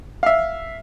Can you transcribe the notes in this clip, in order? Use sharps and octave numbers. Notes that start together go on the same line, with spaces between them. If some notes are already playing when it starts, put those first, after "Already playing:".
E5 F5